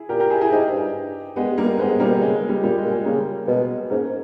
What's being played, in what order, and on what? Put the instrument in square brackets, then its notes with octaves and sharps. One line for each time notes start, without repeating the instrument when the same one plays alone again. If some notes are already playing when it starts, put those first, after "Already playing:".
Already playing: [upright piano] E4 G#4
[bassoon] A#2 [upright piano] G4 A#4
[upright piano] G4 A#4
E4 G#4
E4 G#4
[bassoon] G#2 [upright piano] D#4 G4
[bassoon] G2
[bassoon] G2 [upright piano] G#3 B3
[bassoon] G2
[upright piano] G3 A#3
[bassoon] G2
[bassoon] G#2 [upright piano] G#3 B3
[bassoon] G#2
[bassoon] A#2 [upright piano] G3 A#3
[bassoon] B2
[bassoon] C#3 [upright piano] G#3
[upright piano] G#3
G3
[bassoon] A#2 [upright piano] G3
[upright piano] G#3
[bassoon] A#2
[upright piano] G#3
[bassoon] C#3 [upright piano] G3 A#3
[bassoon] B2 [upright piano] G#3 B3
[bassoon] G#2 [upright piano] A#3 C#4